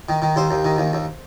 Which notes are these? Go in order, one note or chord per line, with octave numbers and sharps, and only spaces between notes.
D#3
D#3
D#2 C5
D#2
D#3
D#2
D#2